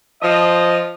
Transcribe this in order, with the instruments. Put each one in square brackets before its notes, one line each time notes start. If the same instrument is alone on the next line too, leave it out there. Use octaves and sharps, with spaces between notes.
[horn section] F3 D#5